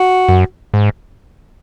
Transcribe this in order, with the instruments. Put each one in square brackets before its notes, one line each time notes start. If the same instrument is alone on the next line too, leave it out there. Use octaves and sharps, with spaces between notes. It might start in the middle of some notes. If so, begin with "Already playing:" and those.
Already playing: [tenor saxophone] F#4
[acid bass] F#2
G#2